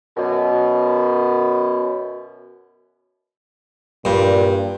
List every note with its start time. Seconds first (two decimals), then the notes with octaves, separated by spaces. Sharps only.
0.17 F#2 B2
4.05 G2 A#2